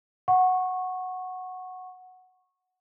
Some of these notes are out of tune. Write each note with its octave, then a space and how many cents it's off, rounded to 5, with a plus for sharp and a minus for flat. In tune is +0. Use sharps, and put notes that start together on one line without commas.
F#5 -5 C#6 -15